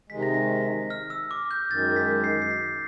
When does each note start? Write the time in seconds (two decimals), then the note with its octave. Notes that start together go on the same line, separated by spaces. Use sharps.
0.09 C3 D#3 G#3 B6
0.22 A#6
0.34 B6
0.90 F6
1.10 E6
1.31 D6
1.51 G6
1.71 F#2 D#3 G#3 A6
1.96 B6
2.24 C7
2.42 C7
2.50 B6